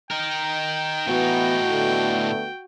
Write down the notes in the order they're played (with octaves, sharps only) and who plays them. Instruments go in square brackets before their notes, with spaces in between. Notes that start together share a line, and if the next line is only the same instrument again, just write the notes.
[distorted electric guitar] D#4 A#4 [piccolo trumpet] G5
[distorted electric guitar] A2 D#4 [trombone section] E3 B3 [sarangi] F#4
[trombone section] D3 A3 B3